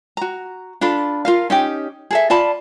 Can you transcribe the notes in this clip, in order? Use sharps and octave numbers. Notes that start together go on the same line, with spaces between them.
F#4 A#5
D4 F4 A4 B5
F4 A#4 F5
C#4 D#4 G4
G#4 A4 E5
F4 D5 A5 B5